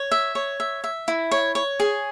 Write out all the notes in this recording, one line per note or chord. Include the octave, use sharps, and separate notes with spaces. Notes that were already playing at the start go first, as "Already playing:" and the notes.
Already playing: C#5
E5
C#5
E5
E5
E4
C#5
C#5
G#4